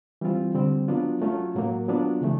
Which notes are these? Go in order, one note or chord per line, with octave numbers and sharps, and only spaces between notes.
E3 G3 C4 F4
D3 G3 C4
F#3 B3 D4 F4
F#3 A3 C#4 F4
A2 F#3 A#3
F#3 B3 D4 F4
C#3 E3 A3